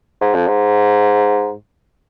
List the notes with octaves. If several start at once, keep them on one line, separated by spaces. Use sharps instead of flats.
G#2
F2
G#2